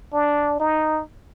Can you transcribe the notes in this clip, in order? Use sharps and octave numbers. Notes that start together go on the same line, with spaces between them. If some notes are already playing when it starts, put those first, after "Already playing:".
D4
D#4